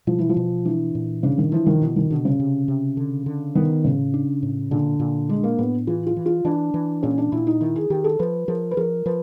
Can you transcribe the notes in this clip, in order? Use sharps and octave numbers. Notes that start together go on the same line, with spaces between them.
B2 F3
E3
F3
B2
E3 D4
A#2
C#3 D4
D#3
E3 F3
D#3
B2 E3
D#3
B2 D3
C#3
C3
C3
D3
D3
D#3 B3
A2 C#3
D4
A2
A#2 D3
A#2
G#3 D4
A#3
A2 B3
E3 F4
F4
E3
F4
E3 D4
E3
A#2 C#4
D4
A#2 E4
D#4
D#3 E4
G#4
D#3 G4
A4
F3 B4
F3 A#4
B4
F3 A#4
F3 B4